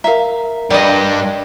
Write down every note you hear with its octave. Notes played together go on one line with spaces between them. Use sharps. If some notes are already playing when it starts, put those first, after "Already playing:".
A#4 E5 F5 A#5
G2 G3 D5 D#5